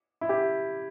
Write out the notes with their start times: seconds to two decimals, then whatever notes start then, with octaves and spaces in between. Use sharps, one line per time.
0.21 E4
0.29 G4